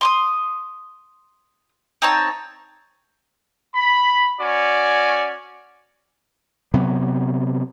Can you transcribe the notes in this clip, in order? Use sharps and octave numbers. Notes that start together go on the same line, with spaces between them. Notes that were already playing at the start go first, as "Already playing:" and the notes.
C6 D6 D#6
C4 D#4 C#5 A5
B5
C#4 F#4 D5 G#5
C3 F#3 B3